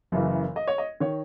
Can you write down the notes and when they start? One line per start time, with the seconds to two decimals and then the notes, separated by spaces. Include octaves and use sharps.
0.12 F#1 F#2 C#3 E3
0.56 D#5
0.68 C#5
0.78 D#5
1.00 D#3 C#5